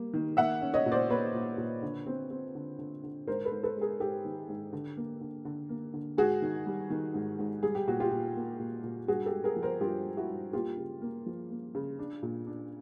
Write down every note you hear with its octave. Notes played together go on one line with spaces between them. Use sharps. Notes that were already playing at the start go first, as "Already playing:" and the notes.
Already playing: G3 A#3
D#3
A#3 E5 F#5
C#4
C#5 D#5
A#2
C5 D5
A#3 B4 C#5
A#2
A#2
D3
C4
C4
D3
D3
D3
G#2 A#4 C5
A4 B4
G#2
A4 B4
G#3
G#4 A#4
G#2 G4 A4
D#3
G#2
D3
A#3
D3
D3
A#3
D3
G#2 F#4 G#4
D#3
G3
D#3
G#2
G#2
G3 G#4
G4
A#2 F#4
F4 G4
A#2
A#3
A#2
A#2
G2 F#4 G#4
G4 A4
G#3
G#4 A#4
F3
A#4 C5
G2 F4 G4
G#3
E4 F#4
G2
A#3 F4 G4
C#3
A#3
F3
A#3
C#3
D4
A#2
D4